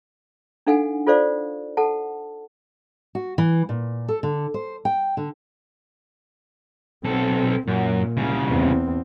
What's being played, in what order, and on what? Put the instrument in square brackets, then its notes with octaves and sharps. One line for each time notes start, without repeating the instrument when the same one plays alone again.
[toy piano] D4 D#4 A4 F5 F#5 G#5
F4 A4 C5 D5 F5
A4 F#5 A5
[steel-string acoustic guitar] F#4
E3
A#2
A4
D3
C5
G5
D3
[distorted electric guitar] B1 A4 [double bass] C4
[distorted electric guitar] F#2 [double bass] A#2
[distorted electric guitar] C2 C#3
[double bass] E2 C4